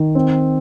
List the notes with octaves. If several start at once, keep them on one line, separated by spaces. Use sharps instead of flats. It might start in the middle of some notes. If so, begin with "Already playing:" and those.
Already playing: D#3
C4